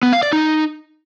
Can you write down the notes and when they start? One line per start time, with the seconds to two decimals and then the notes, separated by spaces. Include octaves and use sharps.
0.03 B3
0.13 F5
0.23 D5
0.33 D#4